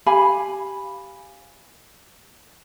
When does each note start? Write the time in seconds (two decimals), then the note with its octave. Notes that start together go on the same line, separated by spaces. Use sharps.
0.06 G4 F5 G#5 B5